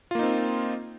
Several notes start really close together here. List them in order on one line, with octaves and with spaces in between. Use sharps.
F4 A#3 D#4 C4